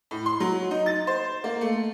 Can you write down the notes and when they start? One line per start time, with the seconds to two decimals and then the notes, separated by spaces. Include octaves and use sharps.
0.11 A2
0.26 C6
0.40 F#3
0.71 D#4
0.86 A6
1.07 C5
1.44 A#3
1.61 A3